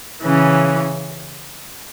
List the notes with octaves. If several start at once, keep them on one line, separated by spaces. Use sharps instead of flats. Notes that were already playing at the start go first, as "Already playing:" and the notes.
C#3 E3 C#4